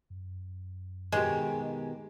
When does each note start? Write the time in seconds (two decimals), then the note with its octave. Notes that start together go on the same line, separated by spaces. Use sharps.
0.10 F#2
1.12 B2 D#3 G#3 G4